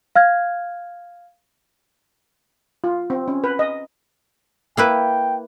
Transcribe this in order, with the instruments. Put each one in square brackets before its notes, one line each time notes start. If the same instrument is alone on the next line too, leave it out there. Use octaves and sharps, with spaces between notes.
[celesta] F5 F6 G#6
[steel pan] F4
C4
C#4
B4
D#5
[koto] A#3 E4 B4 [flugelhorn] G5